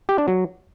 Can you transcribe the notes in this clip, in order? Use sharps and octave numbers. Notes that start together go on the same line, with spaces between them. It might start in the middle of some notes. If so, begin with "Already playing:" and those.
G4
D4
F#3